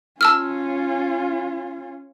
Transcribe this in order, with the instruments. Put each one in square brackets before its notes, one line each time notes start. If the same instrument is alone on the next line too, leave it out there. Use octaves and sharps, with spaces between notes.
[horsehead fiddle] C#4 F4 [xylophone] A5 E6 F6